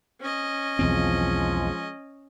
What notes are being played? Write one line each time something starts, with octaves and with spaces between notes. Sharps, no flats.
C#4 D#5
B1 E2 F3 G#3 C4